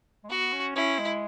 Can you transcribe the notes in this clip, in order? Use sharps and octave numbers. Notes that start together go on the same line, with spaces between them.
G#3
B3 F#4
C#4
C#4 E4
G#3